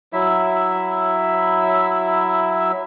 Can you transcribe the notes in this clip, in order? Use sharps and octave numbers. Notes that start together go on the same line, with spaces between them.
F#3 E4 E5